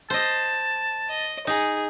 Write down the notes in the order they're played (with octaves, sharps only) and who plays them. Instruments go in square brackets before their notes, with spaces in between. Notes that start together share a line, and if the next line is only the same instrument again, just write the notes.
[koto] C5 D#5 [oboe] A5
[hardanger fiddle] D#5
[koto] D#4 [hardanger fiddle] G#4